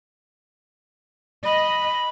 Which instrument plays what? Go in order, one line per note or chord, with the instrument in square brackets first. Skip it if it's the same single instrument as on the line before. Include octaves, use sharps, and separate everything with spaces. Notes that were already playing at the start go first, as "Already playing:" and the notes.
[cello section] D#5 [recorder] B5